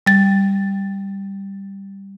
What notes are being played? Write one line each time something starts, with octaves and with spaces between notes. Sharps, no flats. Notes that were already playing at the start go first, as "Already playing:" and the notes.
G3 A6